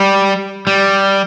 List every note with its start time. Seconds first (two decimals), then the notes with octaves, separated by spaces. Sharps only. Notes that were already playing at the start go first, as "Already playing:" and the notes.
Already playing: G3
0.67 G3